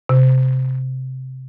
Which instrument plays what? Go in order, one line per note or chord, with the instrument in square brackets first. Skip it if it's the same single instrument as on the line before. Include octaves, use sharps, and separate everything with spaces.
[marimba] C3